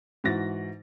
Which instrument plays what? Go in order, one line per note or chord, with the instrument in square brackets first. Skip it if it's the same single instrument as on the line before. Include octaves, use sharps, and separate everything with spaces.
[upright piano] G#2 E3 F#4 A6 A#6